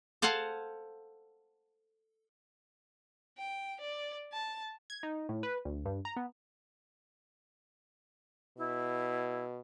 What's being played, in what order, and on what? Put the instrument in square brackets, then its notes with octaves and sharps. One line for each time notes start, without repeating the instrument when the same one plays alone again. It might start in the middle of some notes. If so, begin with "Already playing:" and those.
[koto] A4 C5 F5 F#5 G#5 A5
[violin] G5
D5
A5
[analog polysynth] G#6
D#4
A2
B4
D2
G2
A#5
B3
[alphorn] B2 [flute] E4